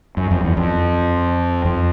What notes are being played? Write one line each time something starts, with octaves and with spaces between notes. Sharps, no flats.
F#2
F2
E2
F2
F2